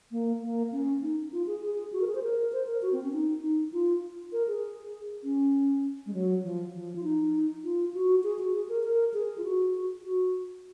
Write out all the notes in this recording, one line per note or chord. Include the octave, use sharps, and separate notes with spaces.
A#3
A#3
C#4
D#4
F4
G#4
G#4
F#4
A#4
G#4
C5
A#4
C5
A#4
F#4
C4
C#4
D#4
D#4
F4
A#4
G#4
C#4
G#3
F#3
F3
F3
F4
D#4
F4
F#4
G#4
F#4
G#4
A#4
A#4
G#4
F4
F#4
F#4